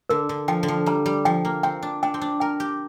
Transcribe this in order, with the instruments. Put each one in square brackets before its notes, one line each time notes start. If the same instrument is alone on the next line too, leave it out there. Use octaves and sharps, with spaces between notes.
[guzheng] D3 [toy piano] A#4
[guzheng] D3
[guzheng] F3 [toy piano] G5
[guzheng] D3
F3
[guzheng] G3 [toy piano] A#5
[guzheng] G3
[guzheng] F3 [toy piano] G5
[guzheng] A#3
[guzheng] C4 [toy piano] G5
[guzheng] D4
[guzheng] D4 [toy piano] G5
[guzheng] C4
D4
[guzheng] A#4 [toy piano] G5
[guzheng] G4